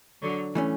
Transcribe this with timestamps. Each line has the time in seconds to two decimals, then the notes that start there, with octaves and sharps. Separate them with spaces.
0.22 D3 F#3
0.55 E3 A3 C#4